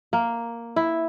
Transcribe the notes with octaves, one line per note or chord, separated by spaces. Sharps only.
A#3
E4